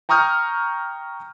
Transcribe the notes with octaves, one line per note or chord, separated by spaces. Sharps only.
G5 A#5 C#6 D#6 F6 G6